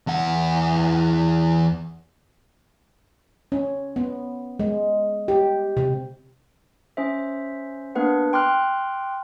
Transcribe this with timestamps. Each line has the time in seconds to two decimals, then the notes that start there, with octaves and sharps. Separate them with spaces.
0.07 E2 F#5
3.52 C#4
3.96 B3
4.59 G#3
5.28 G4
5.77 C3
6.97 C#4 C5 E5
7.95 A#3 B3 D4 B4 F#5
8.33 G5 C6 D6 F6 F#6